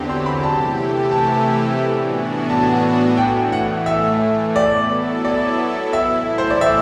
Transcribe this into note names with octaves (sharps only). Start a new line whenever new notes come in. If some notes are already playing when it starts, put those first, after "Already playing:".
Already playing: E2 D3 F#3 C4 G4
C6
B5
C3 E3 A3 E4 G4 A5
A5
A2 E3 B3 D4 F#4
A5
A2 E3 A3 G5
F#5
E5
F#3 B3 E4 A4 D5
D5
A2 E3 A3 E4 E5
C5
D5
E5